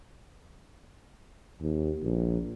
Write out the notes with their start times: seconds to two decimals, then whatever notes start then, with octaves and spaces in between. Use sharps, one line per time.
1.61 D#2
2.04 A#1